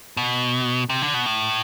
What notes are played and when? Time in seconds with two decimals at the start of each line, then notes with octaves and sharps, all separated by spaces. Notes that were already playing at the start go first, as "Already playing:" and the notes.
0.17 B2
0.90 C3
1.02 D3
1.14 B2
1.26 A2